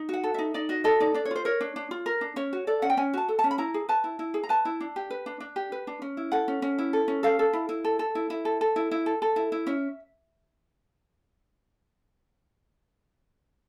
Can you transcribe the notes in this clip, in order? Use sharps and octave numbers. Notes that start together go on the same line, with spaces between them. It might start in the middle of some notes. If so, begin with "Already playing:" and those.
Already playing: D#4
F#4 F#5
A4
D#4 E5
D#4 D5
F#4 D#5
A4 D#5
D#4 D5
D4 D5
C#5
F4 C5
A#4 C#5
D4
D4
F4
A#4
D4
C#4 C#5
F#4
A4 D5
C#4 F#5
G5
C#4 G#5
F#4 A5
A4
A5
C#4
B5
E4 A#5
G#4
B4 A5
E4
E4
G#4
A#5
B4 A5
E4
D4
G4
B4
D4
D4
G4
B4
D4
C#4
E4
A4 F#5
C#4
C#4
E4
A4
C#4
A4 F5
A4
E4
E4
A4
A4
E4
E4
A4
A4
E4
E4
A4
A4
E4
E4
C#4 E5